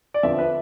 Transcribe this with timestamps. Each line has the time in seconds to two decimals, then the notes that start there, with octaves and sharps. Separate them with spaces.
0.14 D5
0.23 F2 D3 F3 B3 E5
0.39 B4